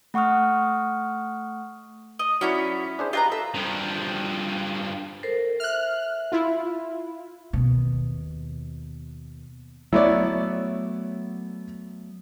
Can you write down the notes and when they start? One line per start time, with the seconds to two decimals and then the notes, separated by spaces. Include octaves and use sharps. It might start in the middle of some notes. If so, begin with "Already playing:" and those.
0.14 A3 F#5 C#6 D#6 F6
2.19 D#5
2.41 F#3 C#4 E4 F#4 C#5 D5
2.99 D4 G#4 C5
3.13 F4 G4 B4 D#5 A#5
3.32 A4 E5
3.55 G2 F3
5.23 A4 A#4 C5
5.60 E5 F6 F#6
6.32 E4 F4
7.53 D#2 B2
9.93 F#3 A3 B3 E4 C#5 D5